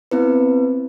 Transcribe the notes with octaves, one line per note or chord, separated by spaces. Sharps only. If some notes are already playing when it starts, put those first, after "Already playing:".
B3 C4 E4 B4